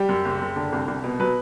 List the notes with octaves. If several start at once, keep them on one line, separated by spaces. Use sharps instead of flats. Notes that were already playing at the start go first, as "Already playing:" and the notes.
Already playing: G3 G4
F#2
F#1
F#1
D3
C2
C2
B2
F#3 B4